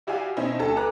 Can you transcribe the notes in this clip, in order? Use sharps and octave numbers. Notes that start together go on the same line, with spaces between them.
E4 F#4 G4 D5 F5 G#5
B2 C4 C#4 D#4 E4
D2 D#4 A4 A5
A4 B4 A#5 D6 F#6